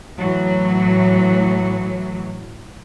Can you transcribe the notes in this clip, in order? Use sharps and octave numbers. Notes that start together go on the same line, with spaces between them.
A2 E3 F#3